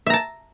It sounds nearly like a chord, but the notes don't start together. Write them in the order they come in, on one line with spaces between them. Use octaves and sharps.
E5 A#5 A5